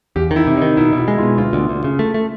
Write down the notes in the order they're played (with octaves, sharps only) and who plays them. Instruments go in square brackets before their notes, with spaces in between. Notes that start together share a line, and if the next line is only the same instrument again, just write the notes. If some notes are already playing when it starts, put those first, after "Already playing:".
[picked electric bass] E2 [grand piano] G4
[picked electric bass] D#3
[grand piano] E4
[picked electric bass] C3
[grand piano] D#4
[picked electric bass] D#3
[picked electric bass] B2 [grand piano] E4
[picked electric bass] B2
[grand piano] E4
[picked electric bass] G#3
[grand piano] F4
[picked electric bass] B2
[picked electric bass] D2 [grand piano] F4
[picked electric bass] D2
D2
C#3
A3
A3